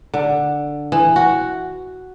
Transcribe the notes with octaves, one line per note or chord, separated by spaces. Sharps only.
D3
E3
F#4